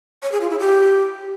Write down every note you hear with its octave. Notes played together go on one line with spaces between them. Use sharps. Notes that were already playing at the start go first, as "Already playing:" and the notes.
C#5
G#4
F4
E4
G4